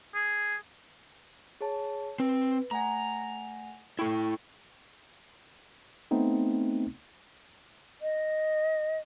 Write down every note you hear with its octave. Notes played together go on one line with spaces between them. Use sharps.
G#4
G#4 C#5 A5
C4 B4
A3 F#5 G#5 A#5
E4 A4 G5 B5 C#6
A3 B3 C4 D#4
D#5